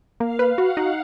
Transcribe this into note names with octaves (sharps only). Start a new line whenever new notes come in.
A#3 F5
B4
F#4 F#5
D#4